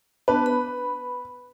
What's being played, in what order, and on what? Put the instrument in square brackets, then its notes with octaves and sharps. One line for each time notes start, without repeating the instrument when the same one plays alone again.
[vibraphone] B3 D4 A5 [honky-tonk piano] B4
[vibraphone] B5